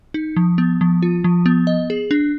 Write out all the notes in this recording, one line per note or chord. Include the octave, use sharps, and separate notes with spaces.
D#4
F3
B3
F3
F4
F3
B3
D#5
G#4
D4